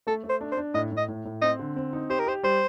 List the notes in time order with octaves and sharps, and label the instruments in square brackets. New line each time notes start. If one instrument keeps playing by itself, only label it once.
[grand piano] A3 [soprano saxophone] A4
[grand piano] A3
[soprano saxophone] C5
[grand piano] D4
[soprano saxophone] C5
[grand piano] D4
[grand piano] A2 [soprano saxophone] D#5
[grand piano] A2
[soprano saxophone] D#5
[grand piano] A2
A2
[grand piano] C4 [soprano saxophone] D#5
[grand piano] D3
C4
D#4
[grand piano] G4 [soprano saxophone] C5
[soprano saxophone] A#4
[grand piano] G4 [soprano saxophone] C5
[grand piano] G3 [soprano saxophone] C5